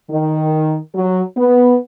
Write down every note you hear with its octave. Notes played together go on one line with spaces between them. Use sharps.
D#3
F#3
B3